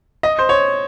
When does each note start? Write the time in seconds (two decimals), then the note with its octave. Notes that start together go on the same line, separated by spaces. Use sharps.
0.23 D#5
0.39 C5
0.49 C#5